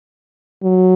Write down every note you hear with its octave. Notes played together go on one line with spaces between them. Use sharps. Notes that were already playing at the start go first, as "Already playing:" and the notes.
F#3